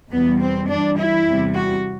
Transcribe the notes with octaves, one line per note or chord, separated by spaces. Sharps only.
E2 B2 G3 B3
C4
G2 E3 G3 D4
E4
E2 C3 G3
F#4